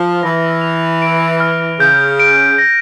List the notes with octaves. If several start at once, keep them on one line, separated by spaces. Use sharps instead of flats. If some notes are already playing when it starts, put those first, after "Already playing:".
Already playing: F3 F6
E3 A#6
F7
D7
F6
C#3 G6
D7
A#6